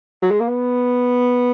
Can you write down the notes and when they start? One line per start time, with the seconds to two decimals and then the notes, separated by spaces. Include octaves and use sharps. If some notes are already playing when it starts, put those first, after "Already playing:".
0.23 F#3
0.31 G#3
0.40 A#3
0.49 B3